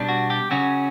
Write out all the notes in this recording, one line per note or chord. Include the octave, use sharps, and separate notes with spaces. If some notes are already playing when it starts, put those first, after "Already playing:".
Already playing: B2 G3 D4
F#4
G4
C#3 F#3 C#4 F#4